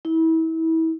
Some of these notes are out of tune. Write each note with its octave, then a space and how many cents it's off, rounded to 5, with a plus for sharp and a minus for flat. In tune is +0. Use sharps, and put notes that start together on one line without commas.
E4 -30